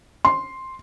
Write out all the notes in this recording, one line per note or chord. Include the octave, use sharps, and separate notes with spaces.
C6